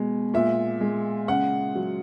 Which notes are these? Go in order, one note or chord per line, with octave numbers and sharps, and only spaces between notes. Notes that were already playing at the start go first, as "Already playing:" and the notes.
Already playing: B2 G#3
A#2 E5
G#3
C#3 F#5
F#3